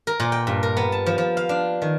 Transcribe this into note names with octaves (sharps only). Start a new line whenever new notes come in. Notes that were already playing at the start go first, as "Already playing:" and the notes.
A#4
A#2
G5
G2
A#4
B3
A5
F3
F3
F5
D4
D#3